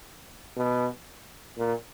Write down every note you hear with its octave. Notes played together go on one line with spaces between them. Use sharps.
B2
A#2